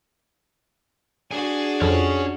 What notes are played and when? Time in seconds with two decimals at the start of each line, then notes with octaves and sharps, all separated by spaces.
1.31 D4 F#4 G#4 G#5
1.81 F2 C#4 C#5